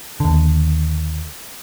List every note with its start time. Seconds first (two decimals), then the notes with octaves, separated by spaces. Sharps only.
0.20 D#2 D3